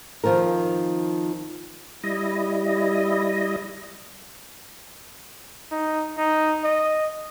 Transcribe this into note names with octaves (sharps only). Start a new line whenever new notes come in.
D#3 F3 C4 A#4
G3 E4 D#5
D#4
D#4
D#5